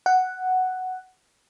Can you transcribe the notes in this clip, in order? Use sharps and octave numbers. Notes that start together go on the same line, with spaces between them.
F#5